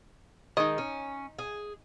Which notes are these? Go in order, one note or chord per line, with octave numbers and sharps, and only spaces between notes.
D#3 G#3 D#4 D#5
C#4
G#4